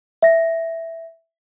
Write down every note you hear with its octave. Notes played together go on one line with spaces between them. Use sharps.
E5 A#6